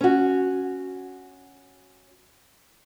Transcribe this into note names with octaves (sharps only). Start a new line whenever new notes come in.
C#4 F#4